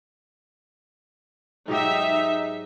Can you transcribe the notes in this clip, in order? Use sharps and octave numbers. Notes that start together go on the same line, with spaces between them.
G#2 F#3 D#4 G4 E5